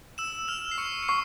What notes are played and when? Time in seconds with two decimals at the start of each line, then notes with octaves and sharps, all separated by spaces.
0.18 E6 E7
0.48 F6 F7
0.71 C7
0.78 C#6 C#7
1.03 C#7
1.08 C#6 C7